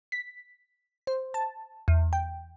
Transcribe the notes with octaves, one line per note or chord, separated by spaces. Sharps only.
B6
C5
A5
E2
G5